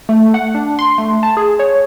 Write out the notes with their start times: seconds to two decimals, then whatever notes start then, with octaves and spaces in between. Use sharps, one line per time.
0.09 A3
0.34 F#5
0.54 D4
0.79 C6
0.98 A3
1.23 A5
1.37 G#4
1.59 C#5